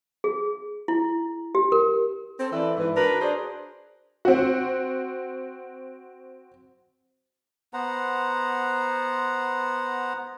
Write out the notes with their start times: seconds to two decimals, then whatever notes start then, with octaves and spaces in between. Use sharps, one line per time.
0.24 G#4
0.88 E4
1.55 G4
1.72 A#4
2.40 C4 A4
2.52 E3 C4 E4 A4 B4 D5
2.77 G#2 E3 B4
2.96 D4 F#4 A#4 B4
3.21 D4 F#4 G#4 C5 D5
4.25 C4 F#4
7.73 B3 C5 F#5 A#5